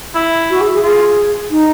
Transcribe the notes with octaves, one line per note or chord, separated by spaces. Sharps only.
E4
F#4
G#4
G#4
F4 G#4
D#4